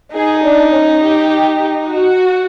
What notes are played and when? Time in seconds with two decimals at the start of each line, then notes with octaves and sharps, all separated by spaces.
0.14 D#4 G#4
0.44 D4
0.72 C#4
1.01 G4
1.90 F#4